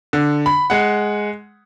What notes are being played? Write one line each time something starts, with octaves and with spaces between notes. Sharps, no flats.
D3
B5
G#3 F#5